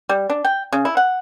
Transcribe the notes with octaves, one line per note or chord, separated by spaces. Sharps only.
G3
D4
G5
C#3
E4
F#5